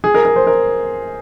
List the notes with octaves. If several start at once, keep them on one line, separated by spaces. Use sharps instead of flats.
G#4
A#4
A#4
C5
A#4